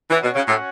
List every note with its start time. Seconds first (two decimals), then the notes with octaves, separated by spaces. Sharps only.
0.10 E3 C#4 F#4 C#5 F#5
0.23 B2
0.35 C#3
0.47 A2